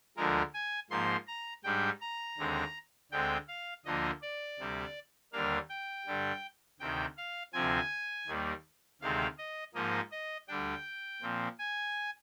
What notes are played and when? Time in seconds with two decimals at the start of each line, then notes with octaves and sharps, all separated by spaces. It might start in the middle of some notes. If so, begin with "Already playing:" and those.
0.17 D2 D3 F3 G#3 A#4
0.54 G#5
0.90 G#2 F3 A#3 C6
1.27 A#5
1.64 G#2 G3 D4 G5
2.01 A#5
2.38 D#2 D3 G#3 C4
3.11 D2 D3 G#3 C4 G5
3.48 F5
3.85 D2 D3 F3 A#3 D4 D#5
4.22 D5
4.59 D2 C3 G3
5.32 D#2 D3 G3 A#3 D4 F5
5.69 G5
6.06 G2 D3 G3
6.80 D2 C3 D#3 G5
7.17 F5
7.53 D2 C3 F3 C4 G#5
8.27 D#2 D#3 G3 A#3
9.01 D2 C3 D#3 G#3 C4 F5
9.38 D#5
9.74 G#2 F3 A#3 D#5
10.11 D#5
10.48 D2 D3 G3 D4 G5
11.22 A#2 F3 C4
11.59 G#5